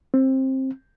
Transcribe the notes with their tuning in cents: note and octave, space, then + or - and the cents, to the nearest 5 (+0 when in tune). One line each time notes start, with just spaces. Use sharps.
C4 +20